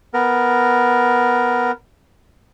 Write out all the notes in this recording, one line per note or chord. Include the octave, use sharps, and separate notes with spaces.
B3 A#4